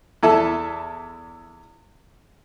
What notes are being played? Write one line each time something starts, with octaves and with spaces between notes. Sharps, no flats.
E2 E4 A4 E5